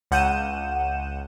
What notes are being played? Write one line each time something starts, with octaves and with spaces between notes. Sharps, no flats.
C#2 F#5 G6 D#7 E7